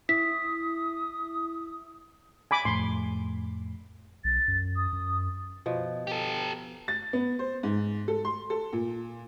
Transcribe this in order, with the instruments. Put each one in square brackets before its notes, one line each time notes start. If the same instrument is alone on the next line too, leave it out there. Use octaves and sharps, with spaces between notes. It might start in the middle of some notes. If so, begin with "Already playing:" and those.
[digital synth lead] E4 [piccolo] D#6 [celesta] B6
[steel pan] G#5 B5 D6
[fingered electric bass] F2 A2 [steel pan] C6
[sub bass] B1 [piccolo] A6
[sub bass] F#2
[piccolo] D#6
[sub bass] F#2
[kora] B2 F3
[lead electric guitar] G4 A4
[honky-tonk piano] A6
B3
C5
G#2
A4
C6
A4
A#2